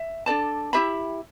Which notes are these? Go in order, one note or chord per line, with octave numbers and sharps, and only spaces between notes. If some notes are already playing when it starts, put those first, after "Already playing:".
Already playing: E5
D4 A4 D5 A5
E4 G4 E5 B5